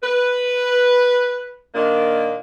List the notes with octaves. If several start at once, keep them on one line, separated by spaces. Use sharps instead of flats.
B4
A#2 D#3 A#3 D4